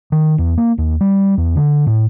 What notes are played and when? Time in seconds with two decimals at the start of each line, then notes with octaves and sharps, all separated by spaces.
0.12 D#3
0.38 E2
0.58 A#3
0.78 D#2
1.01 G3
1.37 E2
1.55 D3
1.86 A2